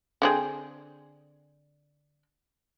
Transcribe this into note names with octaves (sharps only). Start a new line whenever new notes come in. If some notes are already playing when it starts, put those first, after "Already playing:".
D3 C4 G#4